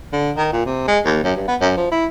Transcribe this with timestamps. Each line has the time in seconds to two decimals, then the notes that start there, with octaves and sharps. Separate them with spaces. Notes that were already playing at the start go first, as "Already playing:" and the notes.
0.13 D3
0.37 D#3
0.53 A#2
0.66 C3
0.88 G#3
1.05 D#2
1.24 F#2
1.36 G2
1.48 B3
1.61 F#2
1.77 F3
1.91 E4